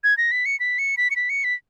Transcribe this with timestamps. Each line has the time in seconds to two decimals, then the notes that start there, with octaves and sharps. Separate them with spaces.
0.04 G#6
0.18 A#6
0.32 B6
0.46 C#7
0.60 B6
0.79 C#7
0.97 B6
1.11 C#7
1.16 B6
1.30 C#7
1.44 B6